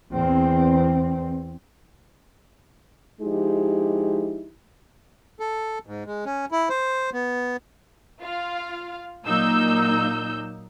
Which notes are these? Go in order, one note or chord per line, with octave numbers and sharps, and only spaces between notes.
E2 C4
F3 G#3 D#4 E4 G4
A4
G#2
G#3
C#4
E4
C5
B3
F4 F5
A#2 F#3 A#3 D#4 E6 G6